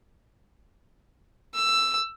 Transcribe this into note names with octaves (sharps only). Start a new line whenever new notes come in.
E6